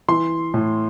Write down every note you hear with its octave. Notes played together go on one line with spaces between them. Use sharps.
E3 C6
A2